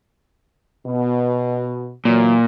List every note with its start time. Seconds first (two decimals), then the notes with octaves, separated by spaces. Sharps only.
0.86 B2
2.05 A#2 E3 F#3